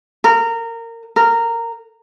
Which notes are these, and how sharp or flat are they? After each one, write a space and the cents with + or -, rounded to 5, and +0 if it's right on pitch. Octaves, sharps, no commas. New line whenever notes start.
A#4 -20
A#4 -15